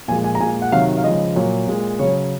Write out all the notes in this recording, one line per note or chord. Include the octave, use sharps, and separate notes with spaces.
A#2 F3 G#3 G#5
G#5
A#5
A#2 G#3 G#5
F#5
C3 D#3 F#3 F5
F5
C#3 F3 G#3 D#5
A#2 F#3
A#2 G#3
C#3 F#3 C#5